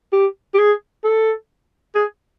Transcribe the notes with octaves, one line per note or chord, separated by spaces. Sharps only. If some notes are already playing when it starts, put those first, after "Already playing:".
G4
G4
G#4
A4
G#4